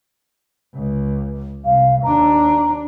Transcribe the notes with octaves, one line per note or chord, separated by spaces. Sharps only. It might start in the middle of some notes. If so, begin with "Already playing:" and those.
C#2
C2 F5
D#2 D4 A#5